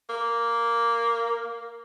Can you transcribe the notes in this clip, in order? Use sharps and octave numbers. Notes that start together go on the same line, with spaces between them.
A#3